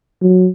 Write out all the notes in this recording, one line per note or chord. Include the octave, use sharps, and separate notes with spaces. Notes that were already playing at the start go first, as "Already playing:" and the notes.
F#3